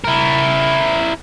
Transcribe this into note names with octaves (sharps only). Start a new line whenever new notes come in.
E4 A#4